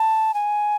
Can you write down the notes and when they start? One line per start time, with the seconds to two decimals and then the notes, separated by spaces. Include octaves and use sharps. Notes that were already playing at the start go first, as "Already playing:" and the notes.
Already playing: A5
0.34 G#5